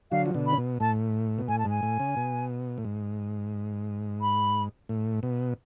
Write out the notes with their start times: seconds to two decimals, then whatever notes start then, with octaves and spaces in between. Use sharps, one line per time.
0.11 D3 F#3 F5
0.26 F3
0.34 B2 D3
0.47 B5
0.53 C#3
0.58 B2
0.80 A2 A5
1.38 B2
1.48 A2 G#5
1.59 A5
1.65 G#2 G#5
1.83 A2
2.00 C#3
2.17 B2
2.78 A2
2.85 G#2
4.22 B5
4.89 A2
5.23 B2